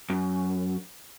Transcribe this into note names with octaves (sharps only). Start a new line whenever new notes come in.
F#2